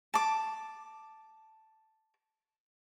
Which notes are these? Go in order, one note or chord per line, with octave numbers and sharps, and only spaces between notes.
A5 D6